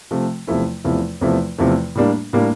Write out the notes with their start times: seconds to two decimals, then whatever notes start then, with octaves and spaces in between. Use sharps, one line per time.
0.11 C3 F3 A3
0.47 E2 C3 F3 A3 E4
0.84 E2 C3 F3 A3 E4
1.21 E2 C3 F3 A3 E4
1.58 E2 C3 F3 A3 E4
1.95 A2 G3 A#3 D4
2.33 A2 G3 A#3 D4